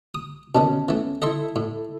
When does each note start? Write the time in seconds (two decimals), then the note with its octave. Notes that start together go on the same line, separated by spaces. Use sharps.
0.15 D#6
0.55 B2 D3 D#3 B3 C#4 A5
0.89 E3 A3
1.22 E4 A4 D#5 E5 C6
1.56 A2